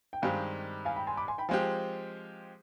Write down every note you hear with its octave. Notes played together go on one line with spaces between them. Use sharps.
G5
G2 D#3 G#3 C4 G4 F5 G#5
F5 G#5
G5 B5
G#5 C6
B5 D6
G#5 C6
G5 B5
F3 G#3 C4 G4 F5 G#5